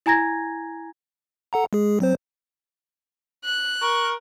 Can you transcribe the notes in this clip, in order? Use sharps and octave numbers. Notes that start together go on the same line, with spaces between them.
E4 G#5 A#5 G#6 A#6
A4 F#5 A#5
G#3 G#4
F#3 C4 C5
F#6
A#4 C#6